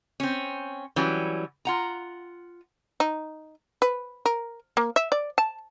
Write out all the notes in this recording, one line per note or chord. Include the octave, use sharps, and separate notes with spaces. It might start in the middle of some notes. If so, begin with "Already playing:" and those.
C4 C#4
E3 F#3 G3 C#4
F4 F#5 A#5
D#4
B4
A#4
A#3
E5
D5
A5